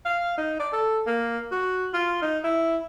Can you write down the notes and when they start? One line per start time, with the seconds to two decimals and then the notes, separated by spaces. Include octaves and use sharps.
0.05 F5
0.37 D#4
0.59 D5
0.73 A4
1.06 A#3
1.52 F#4
1.93 F4
2.22 D#4
2.44 E4